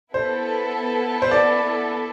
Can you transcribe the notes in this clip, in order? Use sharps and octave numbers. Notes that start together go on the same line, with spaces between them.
B3 E4 A4 C5
C5
D5